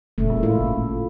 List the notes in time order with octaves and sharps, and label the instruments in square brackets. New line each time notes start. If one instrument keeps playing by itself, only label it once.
[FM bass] F1 [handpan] A#2 C#3 A3
[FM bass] G#3
[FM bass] A2 [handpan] E4 F4
[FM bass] G#1